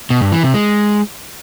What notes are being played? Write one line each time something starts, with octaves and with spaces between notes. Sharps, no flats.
B2
G2
E3
C3
G#3